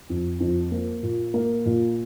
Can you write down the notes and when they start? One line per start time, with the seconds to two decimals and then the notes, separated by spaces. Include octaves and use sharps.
0.09 F2
0.40 F2
0.72 A#3
1.03 A#2
1.34 A#3
1.66 A#2